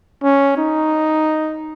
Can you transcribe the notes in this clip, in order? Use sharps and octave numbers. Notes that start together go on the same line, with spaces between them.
C#4
D#4